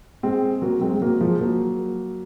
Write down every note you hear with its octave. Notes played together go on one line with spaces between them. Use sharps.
G#3 C4
F#3 A#3
G#3 C4
G#3
F#3 A#3
F3 G#3
F#3 A#3